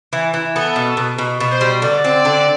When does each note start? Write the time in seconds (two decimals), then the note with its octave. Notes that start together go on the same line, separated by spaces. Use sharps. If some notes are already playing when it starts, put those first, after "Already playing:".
0.13 E3
0.34 E3
0.55 B3 A4
0.76 B2
0.97 B2
1.18 B2
1.40 B2
1.51 C5
1.61 G3
1.82 D3 D5
2.05 C4
2.25 D3